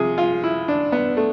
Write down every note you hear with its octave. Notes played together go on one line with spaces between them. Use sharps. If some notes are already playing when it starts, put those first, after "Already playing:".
Already playing: C3 F3 G#4
F4
E4
D4
B3
A3